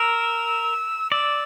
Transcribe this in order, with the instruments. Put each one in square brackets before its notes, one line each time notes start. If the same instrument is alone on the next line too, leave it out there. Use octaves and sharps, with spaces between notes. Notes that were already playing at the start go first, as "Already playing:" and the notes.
Already playing: [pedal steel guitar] A#4 [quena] E6
[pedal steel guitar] D5 [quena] E6